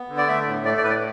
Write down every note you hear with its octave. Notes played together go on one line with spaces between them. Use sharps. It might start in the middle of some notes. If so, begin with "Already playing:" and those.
Already playing: B3
D3
D5
A3 E5
A2
A3 D5
D5
A2 B4
D5